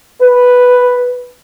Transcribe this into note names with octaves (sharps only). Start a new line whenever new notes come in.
B4